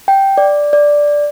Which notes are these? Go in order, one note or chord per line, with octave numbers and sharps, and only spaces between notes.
G5
D5
D5